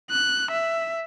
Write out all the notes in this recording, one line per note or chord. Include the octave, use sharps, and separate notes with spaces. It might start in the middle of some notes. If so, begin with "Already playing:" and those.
F#6
E5